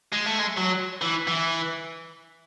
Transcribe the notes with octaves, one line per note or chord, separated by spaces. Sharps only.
G#3
A3
G#3
F#3
E3
E3